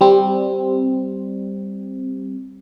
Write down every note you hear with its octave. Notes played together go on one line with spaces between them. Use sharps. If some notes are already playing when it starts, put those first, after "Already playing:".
G3 C4